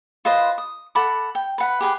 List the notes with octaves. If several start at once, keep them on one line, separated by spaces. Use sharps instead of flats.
F4 B4 C5 D#5
D#6
A4 F#5 B5 D6
G5
B4 F#5 B5
G4 G#4 B4 G5